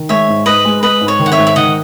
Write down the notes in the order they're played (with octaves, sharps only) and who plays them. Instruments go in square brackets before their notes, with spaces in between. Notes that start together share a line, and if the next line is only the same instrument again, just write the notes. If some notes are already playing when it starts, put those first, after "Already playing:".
Already playing: [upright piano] D#3
[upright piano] G#3 [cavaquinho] C#5 E5
[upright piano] G#2
[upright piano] G#2 [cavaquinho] B4 D#5
[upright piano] G#3
[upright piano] G#3 [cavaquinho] B4 D#5
[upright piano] G#2
[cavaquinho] C#5
[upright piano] D#3
[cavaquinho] F#5
C#5 E5
[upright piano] G#2
[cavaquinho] E5
[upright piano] D#3 [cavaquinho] D#5 F#5